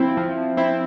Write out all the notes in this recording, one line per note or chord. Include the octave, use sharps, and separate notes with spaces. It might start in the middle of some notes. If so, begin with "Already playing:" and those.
Already playing: F3 C4 E4
F3
C4 E4